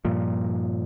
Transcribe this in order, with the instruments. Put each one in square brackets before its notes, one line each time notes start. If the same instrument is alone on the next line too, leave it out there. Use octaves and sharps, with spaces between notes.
[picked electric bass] G2 A#2 F3